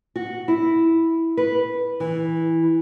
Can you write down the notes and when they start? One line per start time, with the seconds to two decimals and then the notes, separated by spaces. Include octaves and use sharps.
0.16 F#4
0.48 E4
1.37 B4
2.00 E3